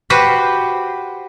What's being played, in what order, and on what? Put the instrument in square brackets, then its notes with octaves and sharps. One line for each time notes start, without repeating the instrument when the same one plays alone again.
[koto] F#4 G4 B4 C5